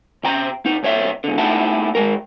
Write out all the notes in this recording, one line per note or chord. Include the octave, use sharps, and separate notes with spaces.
C3 G5 A#5
C3 D#4
C2 C#5 E5
G#2 D3
A3 D#4 E4 F#5 G5 A5
G#2 C3 G#3 A#4